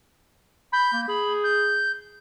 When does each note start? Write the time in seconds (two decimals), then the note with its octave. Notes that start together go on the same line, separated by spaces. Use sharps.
0.73 B5 G6
0.93 A#3
1.08 G#4 B5
1.44 G6